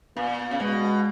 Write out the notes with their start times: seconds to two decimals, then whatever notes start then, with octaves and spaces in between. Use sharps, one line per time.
0.16 A#2 B3
0.51 C#3
0.60 B2 G#3